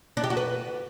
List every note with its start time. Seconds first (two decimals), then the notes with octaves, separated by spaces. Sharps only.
0.17 D4
0.24 G4
0.30 F#4
0.37 B4